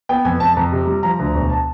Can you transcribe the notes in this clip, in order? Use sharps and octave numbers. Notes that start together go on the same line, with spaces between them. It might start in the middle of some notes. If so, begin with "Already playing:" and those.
B3 G5
F2 G#5
F2 A5
A5
F2 A#5
C3
G3
F3 A#5
D2
E1
A5